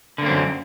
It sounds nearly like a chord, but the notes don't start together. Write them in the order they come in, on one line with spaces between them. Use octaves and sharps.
D3 A#3 C4 F#2